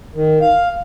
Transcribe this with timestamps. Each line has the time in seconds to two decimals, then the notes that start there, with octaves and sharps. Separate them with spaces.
0.15 D#3
0.41 F5